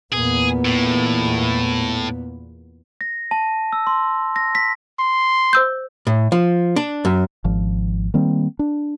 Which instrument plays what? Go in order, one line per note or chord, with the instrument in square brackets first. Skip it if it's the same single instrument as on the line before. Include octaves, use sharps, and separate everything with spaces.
[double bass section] E2 A#2 B3 [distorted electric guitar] G#4
[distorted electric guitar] A2
[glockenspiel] A#6
A5
E6
C6
A#6
B6
[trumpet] C6
[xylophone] C5 E6 G6
[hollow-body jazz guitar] A2
F3
D4
F#2
[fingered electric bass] G#1 F3
D#3 G3 A#3 C4
D4